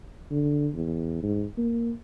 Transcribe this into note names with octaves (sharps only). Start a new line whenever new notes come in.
D3
E2
G#2
A#3